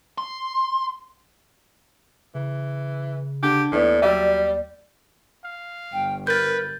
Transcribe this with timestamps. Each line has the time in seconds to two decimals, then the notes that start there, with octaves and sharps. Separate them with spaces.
0.18 C6
2.35 C#3 E3
3.43 D3 G4
3.72 D#2 A2 E3 B3 D5
4.02 F#3 G3 E5
5.44 F5
5.93 G1 G5
6.27 A#4 B4 G6 A6